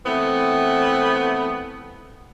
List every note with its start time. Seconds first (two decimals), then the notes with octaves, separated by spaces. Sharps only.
0.05 E3 A3 B3 C4